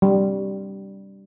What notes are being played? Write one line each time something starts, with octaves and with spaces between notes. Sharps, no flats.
G3